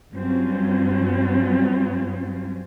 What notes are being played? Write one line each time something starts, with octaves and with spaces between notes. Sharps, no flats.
G2 F#3 G3 C4 C#4 F4